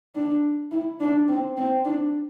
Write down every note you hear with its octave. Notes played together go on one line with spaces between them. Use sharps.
D4
E4
D4
C4
C4
D4